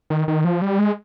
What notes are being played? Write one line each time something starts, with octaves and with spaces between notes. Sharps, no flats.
D#3
D#3
F3
G3
G#3